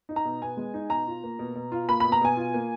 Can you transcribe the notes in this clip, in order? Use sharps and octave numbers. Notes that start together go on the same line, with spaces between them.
D#4
A#5
B2
B3 G#5
G#3
D#4
B2 A#5
F4
A#3
B2
B2
F4
A#3 B5
B2 B5
A#5
B2 G#5
F4
A#3